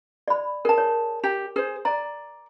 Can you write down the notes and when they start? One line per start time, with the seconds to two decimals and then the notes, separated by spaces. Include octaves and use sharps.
0.28 D5 B5
0.65 G#4 A#4 A5
0.78 C#5
1.24 G4
1.56 G#4 C5
1.85 D5 A#5